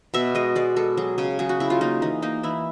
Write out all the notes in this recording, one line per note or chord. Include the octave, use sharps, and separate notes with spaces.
B2 E5
G#3 D#5
G#3 D5
G#3 A4
F#3 G#4
C#3 G#4
F#3 G#4
F#4
C#3 E4
F4
A#3 D#4
E3 D#4
A#3 D#4
E3 E4